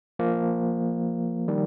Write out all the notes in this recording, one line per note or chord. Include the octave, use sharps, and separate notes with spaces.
F3 A#3
D#3 G3